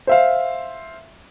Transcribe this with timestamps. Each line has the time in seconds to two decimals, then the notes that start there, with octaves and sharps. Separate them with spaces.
0.07 C5 E5 F5